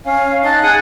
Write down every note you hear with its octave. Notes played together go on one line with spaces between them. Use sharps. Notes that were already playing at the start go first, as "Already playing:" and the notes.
C#4 F5
D#4 A5 F#6
G#4 F#5 D#6